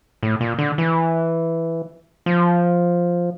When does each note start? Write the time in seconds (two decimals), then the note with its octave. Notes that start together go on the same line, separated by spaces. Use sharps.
0.23 A2
0.41 A#2
0.59 D3
0.78 E3
2.26 F3